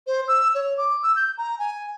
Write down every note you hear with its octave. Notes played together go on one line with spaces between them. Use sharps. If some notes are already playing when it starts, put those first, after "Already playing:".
C5
E6
C#5
D6
E6
G6
A#5
G#5